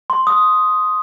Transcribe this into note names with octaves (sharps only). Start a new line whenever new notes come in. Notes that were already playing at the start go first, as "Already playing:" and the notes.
C6
D#6